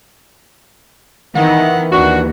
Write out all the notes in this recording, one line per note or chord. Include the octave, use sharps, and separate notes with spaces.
D#3 E3 B3 F#5
D#2 D4 F#4